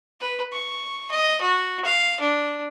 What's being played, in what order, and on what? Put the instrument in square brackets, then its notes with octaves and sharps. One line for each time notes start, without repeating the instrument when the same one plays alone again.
[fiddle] B4
C#6
D#5
F#4
F5
D4